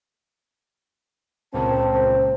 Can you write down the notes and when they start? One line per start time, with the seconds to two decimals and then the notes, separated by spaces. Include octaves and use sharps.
1.54 C#2 A#2 C#3 C4 A5
1.93 C5